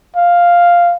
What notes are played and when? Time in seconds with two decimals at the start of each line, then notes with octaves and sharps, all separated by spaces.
0.16 F5